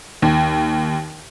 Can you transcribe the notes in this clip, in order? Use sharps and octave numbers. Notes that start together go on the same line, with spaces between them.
D#2